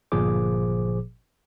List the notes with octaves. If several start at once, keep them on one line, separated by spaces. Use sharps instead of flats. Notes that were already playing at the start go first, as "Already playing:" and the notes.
G1 A#2 F3 G#4 C5 D6